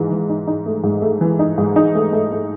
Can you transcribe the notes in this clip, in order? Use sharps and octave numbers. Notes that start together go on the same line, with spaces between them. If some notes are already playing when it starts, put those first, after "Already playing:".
Already playing: G#2 E3
E3
D#4
D#4
A3
G#2
A3
E3
D#4
G#2
D#4
A3
A3
A3